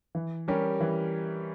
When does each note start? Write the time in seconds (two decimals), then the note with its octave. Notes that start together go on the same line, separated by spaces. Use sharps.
0.15 E3
0.48 G3 C#4 G4 A#4
0.81 E3